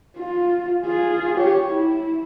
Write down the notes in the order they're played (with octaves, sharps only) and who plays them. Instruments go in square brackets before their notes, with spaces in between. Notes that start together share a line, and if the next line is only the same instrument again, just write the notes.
[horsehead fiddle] F4
F4 G#4
G4 C#5
E4